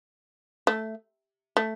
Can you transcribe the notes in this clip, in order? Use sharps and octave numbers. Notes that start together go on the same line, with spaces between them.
A3
A3